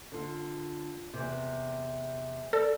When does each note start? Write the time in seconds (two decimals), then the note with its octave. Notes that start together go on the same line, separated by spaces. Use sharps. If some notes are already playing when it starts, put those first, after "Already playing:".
0.12 D3 F4
1.14 E2 C3
2.53 A4 D5